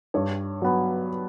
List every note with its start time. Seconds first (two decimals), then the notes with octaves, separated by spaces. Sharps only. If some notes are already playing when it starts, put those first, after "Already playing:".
0.14 G2 C#5
0.62 F#3 B3